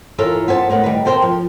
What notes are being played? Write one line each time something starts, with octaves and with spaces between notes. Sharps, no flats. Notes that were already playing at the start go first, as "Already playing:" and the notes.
E3 F4 A4 A#4 C#5
B3 C5 G#5 A5
A2 A#4 B4 F#5
D#3 G3 B4
A4 A#4 C5 E5 G5
F3